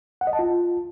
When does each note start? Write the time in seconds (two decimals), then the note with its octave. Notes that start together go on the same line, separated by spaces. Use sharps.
0.21 F#5
0.27 D#5
0.33 A5
0.39 F4